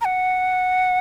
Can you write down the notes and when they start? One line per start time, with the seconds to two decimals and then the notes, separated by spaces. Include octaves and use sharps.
0.01 A#5
0.05 F#5